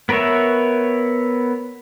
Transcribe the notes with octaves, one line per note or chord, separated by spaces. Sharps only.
B3 A#4 B4 C#5 E5